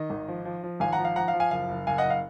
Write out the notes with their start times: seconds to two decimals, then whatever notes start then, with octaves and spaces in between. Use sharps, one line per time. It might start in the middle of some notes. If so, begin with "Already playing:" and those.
Already playing: D#3 D#5
0.10 G#1
0.28 F3
0.45 F3
0.63 F3
0.80 G#1 F5 G#5
0.93 F#5 A#5
0.98 F3
1.05 F5
1.16 F3 F#5 A#5
1.28 F5
1.34 F3
1.40 F5 G#5
1.51 F#1 F5
1.69 F#1
1.87 F#1 F5 G#5
1.98 D#5 F#5
2.04 F#1
2.10 F5